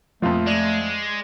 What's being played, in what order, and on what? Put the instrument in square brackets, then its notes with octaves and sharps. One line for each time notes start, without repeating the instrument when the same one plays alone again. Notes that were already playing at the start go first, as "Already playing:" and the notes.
[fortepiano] A#1 F2 [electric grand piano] F3 F4 [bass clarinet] A3
[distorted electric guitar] G#3 [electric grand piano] D5